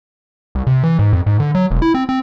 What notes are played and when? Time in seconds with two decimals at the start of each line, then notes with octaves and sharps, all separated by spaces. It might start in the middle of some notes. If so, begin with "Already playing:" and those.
0.55 C2
0.67 C3
0.83 E3
0.99 G#2
1.13 F2
1.26 G#2
1.40 D3
1.55 F#3
1.71 E1
1.82 E4
1.94 C4
2.09 C4